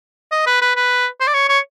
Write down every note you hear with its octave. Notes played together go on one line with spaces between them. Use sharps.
D#5
B4
B4
B4
C5
D5
C#5
C#5